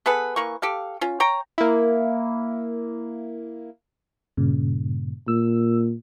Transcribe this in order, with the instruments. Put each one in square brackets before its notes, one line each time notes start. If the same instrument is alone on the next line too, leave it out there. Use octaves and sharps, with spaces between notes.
[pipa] B3 G#4 A4 B4
E3 A#3 C#6
G4 A4 F5
C#4 F4
C#5 G5 A#5
[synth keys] A#3 E4
[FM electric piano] G2 A#2 C#3
[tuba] A#2 [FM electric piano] E6